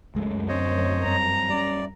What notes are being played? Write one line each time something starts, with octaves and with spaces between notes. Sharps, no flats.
C#2 F#2 G#3 A3
D2 C4 C#4 C5 C#5 D#5
G2 C4 A#5
G3 C#4 D5